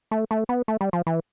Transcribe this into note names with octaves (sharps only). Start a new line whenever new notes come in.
A3
A3
B3
A3
G3
F3
E3